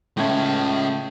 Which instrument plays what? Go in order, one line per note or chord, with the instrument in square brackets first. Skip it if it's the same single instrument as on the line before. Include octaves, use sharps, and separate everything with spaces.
[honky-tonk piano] A2 A3 G#6 [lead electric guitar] G#3 C#4